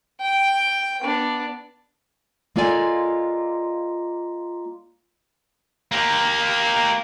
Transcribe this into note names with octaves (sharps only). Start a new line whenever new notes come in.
G5
B3 D4
G#3 A#3 F4 A4 D5 G#5
A#3 G4